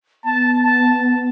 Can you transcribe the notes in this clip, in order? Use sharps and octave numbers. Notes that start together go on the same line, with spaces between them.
B3 A5
A5